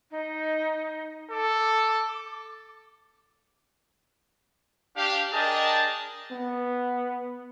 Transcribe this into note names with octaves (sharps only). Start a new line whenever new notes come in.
D#4
A4 D6
D4 G4 F5
D4 G#4 A#4 D#5 G5 A5
B3